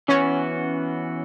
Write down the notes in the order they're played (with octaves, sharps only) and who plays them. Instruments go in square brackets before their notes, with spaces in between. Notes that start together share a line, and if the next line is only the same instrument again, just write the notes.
[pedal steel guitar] E3 B3 F#4 [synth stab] C#4